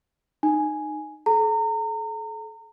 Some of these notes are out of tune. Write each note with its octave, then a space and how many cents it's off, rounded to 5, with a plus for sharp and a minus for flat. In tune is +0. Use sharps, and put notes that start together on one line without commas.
D#4 -25 G#5 +5
A4 -40 A#5 -35